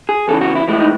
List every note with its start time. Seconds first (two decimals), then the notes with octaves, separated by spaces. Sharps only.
0.09 G#4
0.28 E2 C#3 E3 A4
0.41 F#4
0.55 E4
0.68 A2 E3 G#3 E4
0.80 D#4